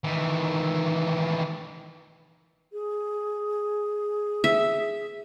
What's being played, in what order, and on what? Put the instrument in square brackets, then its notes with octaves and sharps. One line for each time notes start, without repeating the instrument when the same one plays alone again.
[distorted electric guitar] D#3 E3
[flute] G#4
[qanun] E5